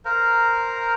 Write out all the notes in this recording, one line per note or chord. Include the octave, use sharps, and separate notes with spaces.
A#4 C5 F5 A#5